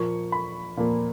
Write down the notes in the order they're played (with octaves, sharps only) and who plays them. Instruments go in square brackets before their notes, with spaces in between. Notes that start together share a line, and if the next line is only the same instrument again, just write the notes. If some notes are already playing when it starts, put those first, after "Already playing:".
Already playing: [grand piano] A#2 F3 A#3 C#6
B5
A#2 F3 A#3